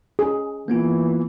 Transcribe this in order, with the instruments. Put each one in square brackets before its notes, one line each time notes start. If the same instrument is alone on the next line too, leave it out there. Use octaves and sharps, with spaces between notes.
[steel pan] G#4
[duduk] E3 [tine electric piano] A#3 B3 F4